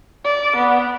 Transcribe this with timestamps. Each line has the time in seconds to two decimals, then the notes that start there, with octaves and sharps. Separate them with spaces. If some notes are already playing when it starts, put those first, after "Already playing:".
0.24 D5
0.56 B3